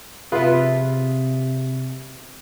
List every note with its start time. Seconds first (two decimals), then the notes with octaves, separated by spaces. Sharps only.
0.32 C3 F4 G#4 B4 E5